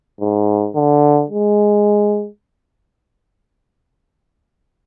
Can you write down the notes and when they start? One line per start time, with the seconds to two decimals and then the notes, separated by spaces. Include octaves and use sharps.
0.21 G#2
0.75 D3
1.30 G#3